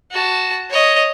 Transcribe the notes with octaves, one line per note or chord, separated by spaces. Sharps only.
F#4 A5
C#5 D#5